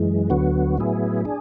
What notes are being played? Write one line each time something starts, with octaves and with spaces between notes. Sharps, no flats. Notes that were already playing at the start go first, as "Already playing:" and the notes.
Already playing: F#2 E3 G#3
D2 D3 F#3 B3 F#4
A2 F#3 B3 E4 G#4
D4 G#4